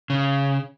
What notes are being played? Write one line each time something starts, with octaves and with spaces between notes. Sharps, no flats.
C#3